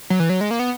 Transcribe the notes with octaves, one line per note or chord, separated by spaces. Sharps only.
F#3
E3
F#3
G#3
A#3
B3